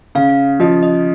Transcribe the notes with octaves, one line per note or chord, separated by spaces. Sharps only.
C#3 F5
F3 D#5
D#5